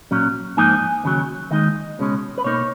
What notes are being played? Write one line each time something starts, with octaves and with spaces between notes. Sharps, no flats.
A#2 F#3 C#4
G#2 F3 A#3 D#4 G#5
D#2 C#3 F#3
D#2 D#3 G#3 D#4 D#5
C#2 B2 G#3 C#4
B4
B2 A#3 D#4 C#5